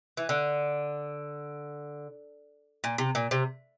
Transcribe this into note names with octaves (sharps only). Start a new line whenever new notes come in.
E3
D3
A#2
C3
A#2
C3